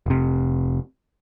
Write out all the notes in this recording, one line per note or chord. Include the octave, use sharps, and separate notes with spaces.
F1 C3